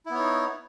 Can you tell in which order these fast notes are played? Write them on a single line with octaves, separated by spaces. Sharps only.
E4 B3 C#5 D#4